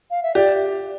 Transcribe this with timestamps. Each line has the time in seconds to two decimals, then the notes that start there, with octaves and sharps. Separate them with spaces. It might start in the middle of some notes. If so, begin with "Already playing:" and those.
0.11 F5
0.23 E5
0.35 G4 D5